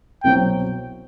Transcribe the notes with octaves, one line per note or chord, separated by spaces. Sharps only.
C2 B2 F#3 C4 G5